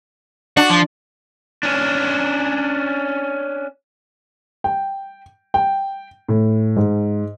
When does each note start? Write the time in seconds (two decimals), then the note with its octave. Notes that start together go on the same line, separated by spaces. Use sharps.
0.57 D4 F#4
0.70 F3
1.63 C#4 D4
4.64 G5
5.54 G5
6.29 A2
6.76 G#2